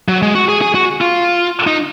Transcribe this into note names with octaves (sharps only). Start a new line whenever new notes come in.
F#3
G#3
F#4
G#4
G#4
F#4
F4
D#4